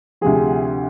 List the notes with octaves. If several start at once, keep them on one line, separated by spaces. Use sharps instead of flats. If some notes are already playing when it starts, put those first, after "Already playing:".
D2 C3 F3 G#4